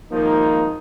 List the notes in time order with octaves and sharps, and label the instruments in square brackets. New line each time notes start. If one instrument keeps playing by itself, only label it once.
[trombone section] G#1 F3 D#4 [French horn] A#3